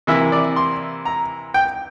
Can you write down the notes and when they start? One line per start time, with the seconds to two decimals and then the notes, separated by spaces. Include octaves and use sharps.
0.07 C3 E3 A#3 E4 E5
0.32 D5
0.56 C6
1.05 A#5
1.54 G5